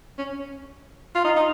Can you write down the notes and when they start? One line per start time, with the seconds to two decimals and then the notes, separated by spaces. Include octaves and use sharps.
0.18 C#4
1.15 F4
1.25 D#4
1.37 D#4